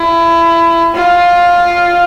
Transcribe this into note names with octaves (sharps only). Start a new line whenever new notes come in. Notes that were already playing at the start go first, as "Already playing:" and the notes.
Already playing: E4
F4